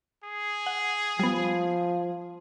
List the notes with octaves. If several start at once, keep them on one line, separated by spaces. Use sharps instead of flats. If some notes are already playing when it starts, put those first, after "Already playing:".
G#4
F#5
F3 G3 B3